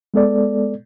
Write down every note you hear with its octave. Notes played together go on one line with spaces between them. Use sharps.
G#3 B3 A4 D5